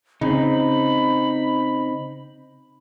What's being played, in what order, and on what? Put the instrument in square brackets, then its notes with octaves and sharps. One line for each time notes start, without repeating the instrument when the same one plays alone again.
[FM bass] C#3 [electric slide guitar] C4 D#4 [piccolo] B5